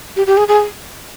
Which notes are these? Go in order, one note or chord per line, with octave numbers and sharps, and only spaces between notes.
G4
G4
G#4
G#4